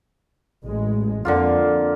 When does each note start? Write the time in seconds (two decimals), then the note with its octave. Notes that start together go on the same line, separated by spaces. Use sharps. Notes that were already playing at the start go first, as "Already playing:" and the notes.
0.64 A1 G#3
1.25 F2 D3 A#3 F4